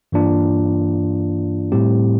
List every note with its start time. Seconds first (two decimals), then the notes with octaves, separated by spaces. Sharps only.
0.12 G2 E3 A#3 D4 F4
1.72 A2 G3 C4 G4